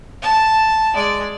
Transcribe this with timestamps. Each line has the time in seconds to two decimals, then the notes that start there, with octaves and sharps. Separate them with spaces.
0.22 A5
0.95 G#3 D5